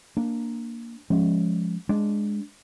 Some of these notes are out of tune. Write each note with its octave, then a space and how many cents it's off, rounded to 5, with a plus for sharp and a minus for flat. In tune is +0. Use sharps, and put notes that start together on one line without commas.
A#3 +0 D4 +0
F3 +0 G#3 +0 C#4 +0
G#3 +0 D4 +0